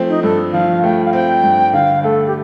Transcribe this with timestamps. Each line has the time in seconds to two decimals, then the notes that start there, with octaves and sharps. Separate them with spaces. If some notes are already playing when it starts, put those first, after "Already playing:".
Already playing: F3 A3 C4
0.09 D#4
0.23 G2 A4
0.53 F3 F5
0.83 A3 G5
1.05 F5
1.13 C4 G5
1.43 G2
1.73 D3 F5
2.03 A3 A4
2.27 G4